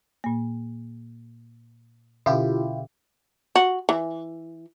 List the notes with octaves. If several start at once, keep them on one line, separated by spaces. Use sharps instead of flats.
A#2 A#3
B2 D3 C#4 E4 F4 G4
F#4
E3